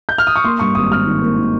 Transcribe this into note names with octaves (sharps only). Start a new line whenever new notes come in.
G6
F6
D#6
C#6
A#3 C6
G2 C#6
G#1 D#6
G#1 F6
D#3
A#3
D#3